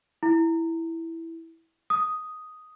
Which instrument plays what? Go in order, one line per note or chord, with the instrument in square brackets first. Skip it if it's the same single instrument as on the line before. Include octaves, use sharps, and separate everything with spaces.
[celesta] E4
D#6